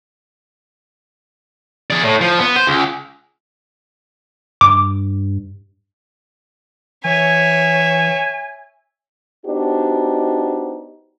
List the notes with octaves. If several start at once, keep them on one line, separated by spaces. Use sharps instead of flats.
G#4 D5
A2
F3
B3
C5
C#2
G2 D6
E3 C#5 E5 G#5
B3 D4 D#4 F#4 G4 C5